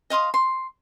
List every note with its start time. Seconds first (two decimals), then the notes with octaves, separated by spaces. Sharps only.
0.10 D#5 F5 C6 D#6
0.34 C6